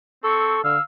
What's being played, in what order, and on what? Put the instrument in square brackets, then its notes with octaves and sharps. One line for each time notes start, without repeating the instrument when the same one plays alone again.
[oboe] C4 [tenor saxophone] A4 [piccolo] C#6
[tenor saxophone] D3 [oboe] F5 [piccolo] E6